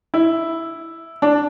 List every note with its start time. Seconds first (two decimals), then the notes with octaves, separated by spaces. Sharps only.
0.14 E4
1.22 D4